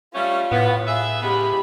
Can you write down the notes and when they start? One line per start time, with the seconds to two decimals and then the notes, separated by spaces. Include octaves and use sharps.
0.15 G3 A3 C#4 F4
0.52 A2 B3
0.87 G#4 B4 E5
1.22 C#3 G#3 B3 G4 B5